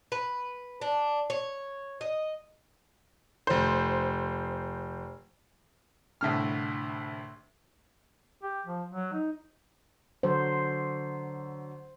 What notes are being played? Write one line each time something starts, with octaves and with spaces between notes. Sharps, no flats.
B4
D4
C#5
D#5
F1 C5
C2 A2 D3 F6
G4
F3
F#3
D#4
D3 F#3 C5